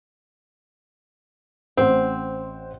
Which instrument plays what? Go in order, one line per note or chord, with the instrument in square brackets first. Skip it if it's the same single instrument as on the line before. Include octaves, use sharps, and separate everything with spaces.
[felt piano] A1 C5 F#5 [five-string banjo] C4